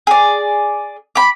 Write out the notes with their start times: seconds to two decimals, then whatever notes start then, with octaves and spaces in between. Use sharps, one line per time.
0.07 G#4 D5
1.15 B5 D6